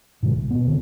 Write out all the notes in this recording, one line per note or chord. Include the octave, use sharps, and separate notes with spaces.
G#2 B2 D3 G#3
B1
B2 B3
F#1 D3 D#3 C4